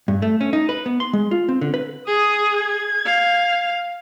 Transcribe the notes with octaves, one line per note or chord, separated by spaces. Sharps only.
G2
A3
C#4
D#4
B4
B3
C6
G#3
F4
C4
D3
B4
G#4 D#6
G#6
F5